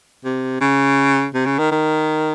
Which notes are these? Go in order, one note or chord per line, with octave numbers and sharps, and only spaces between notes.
C3
C#3
C3
C#3
D#3
D#3